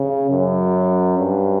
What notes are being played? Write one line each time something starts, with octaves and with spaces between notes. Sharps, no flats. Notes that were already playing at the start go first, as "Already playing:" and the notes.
Already playing: C#3
F#2
G2